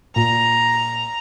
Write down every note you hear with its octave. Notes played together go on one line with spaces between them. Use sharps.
A#2 A#5